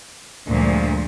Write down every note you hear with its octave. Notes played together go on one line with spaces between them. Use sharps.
D2 G2 A#2 F3 G#3